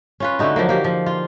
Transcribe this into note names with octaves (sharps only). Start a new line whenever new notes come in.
C#4 F4 B4
D3 A3 D#4 F#4
F3 F#3 A#3
A#3 G4
F3
F4